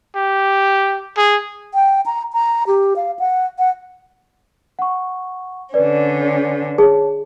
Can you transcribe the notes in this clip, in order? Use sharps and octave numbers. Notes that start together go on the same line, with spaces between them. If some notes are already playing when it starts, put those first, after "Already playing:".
G4
G#4
G5
A#5
A#5
G4
F5
F#5
F#5
F#5 C#6
D3 C#4 B4 D5
G#4 C#5 A5